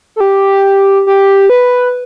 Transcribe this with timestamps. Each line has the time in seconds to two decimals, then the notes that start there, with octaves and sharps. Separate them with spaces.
0.16 A4
0.20 G4
1.07 G4
1.50 B4